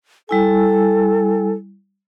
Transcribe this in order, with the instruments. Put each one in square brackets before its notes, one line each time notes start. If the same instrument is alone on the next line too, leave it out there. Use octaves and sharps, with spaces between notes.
[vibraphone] G3 E4 G#5 [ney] A4